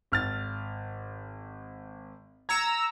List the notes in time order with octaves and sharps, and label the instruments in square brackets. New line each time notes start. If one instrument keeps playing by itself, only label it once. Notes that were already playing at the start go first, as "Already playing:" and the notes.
[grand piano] G#1 F6 A6
[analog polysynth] A#5 E6 [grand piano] G#6 C#7